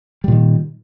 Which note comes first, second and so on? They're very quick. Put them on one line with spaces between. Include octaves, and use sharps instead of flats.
G3 A#2 D#3